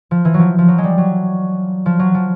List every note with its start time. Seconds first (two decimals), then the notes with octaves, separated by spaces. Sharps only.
0.11 F3
0.25 E3
0.34 F#3
0.39 F3
0.58 F3
0.68 F#3
0.78 G#3
0.83 G3
0.98 F#3
1.86 F3
1.99 F#3
2.14 F3